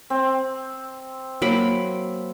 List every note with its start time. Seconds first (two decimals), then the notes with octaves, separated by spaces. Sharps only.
0.10 C4
1.42 F#3 A#3 B5